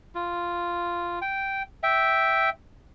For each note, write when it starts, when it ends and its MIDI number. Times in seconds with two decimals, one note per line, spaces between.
0.15 1.19 65
1.22 1.63 79
1.83 2.50 76
1.83 2.50 79